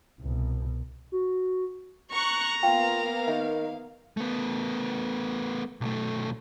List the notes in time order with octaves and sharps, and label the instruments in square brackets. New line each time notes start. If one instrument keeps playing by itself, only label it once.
[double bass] C2 B2
[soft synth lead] F#4
[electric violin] A#5 [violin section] C#6 F#6
[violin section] A#3 B3 F5 [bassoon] F4 [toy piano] G5
[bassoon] D#3 [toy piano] E5
[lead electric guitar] A3 B3
B1 A3